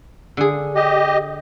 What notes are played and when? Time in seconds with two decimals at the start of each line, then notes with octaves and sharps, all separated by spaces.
0.37 D3 G#4
0.75 G4 D#5